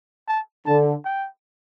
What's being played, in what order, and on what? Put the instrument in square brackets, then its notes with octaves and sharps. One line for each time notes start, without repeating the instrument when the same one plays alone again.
[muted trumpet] A5
[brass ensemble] D3 [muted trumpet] A5
[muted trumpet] G5